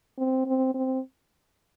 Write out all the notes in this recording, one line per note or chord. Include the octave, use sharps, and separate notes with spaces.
C4
C4
C4